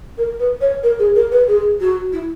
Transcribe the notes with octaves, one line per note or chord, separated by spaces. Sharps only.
A#4
B4
C#5
A#4
G#4
A#4
B4
G#4
F#4
E4